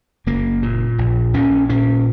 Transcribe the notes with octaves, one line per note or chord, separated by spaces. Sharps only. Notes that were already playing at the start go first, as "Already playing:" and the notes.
F#1 A#3
A#2
A#1
A#1 C#4
A#2 C#4